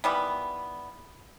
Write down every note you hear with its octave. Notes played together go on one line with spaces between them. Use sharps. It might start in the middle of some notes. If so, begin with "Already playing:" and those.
D#3 E3 G3 B3